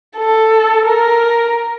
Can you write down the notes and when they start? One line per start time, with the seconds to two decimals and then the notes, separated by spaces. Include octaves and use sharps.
0.18 A4
0.86 A#4